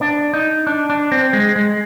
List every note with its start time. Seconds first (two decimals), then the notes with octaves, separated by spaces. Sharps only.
0.01 D4
0.34 D#4
0.67 D4
0.90 D4
1.12 C4
1.33 G#3
1.56 G#3